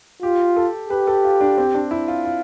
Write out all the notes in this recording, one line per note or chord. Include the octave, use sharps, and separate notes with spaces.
F4 G4
A4
G4 B4
A4
F4
D4
C4
D4
E4
F4
F4